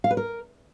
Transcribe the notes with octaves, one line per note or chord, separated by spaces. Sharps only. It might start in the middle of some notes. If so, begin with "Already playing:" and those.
F5
B4
A#4